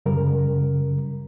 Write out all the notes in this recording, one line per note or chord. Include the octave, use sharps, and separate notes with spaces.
F#2 C#3 G3 A#4